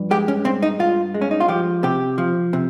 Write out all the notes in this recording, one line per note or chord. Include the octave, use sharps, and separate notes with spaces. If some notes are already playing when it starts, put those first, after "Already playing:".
Already playing: G2 F3
G#3 G4
C#4
G2 C4
D#4
G2 F4
G#3
C#4
D#4
F4
F3 G4
C3 G4
F3
C3